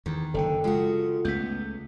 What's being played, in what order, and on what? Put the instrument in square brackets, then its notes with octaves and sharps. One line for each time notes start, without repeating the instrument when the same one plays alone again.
[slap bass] E2 [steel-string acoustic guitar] D#3
[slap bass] F#1 D3 [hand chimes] A4 G5
[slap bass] C#3 [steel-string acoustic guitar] G#3 F#4 [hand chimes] F4 A4
[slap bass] C#2 A3 [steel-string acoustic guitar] B3 [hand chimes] G6 B6